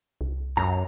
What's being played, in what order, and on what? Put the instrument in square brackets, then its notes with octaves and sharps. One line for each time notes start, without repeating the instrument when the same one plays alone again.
[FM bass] C2
[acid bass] F#2 [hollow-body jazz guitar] A#5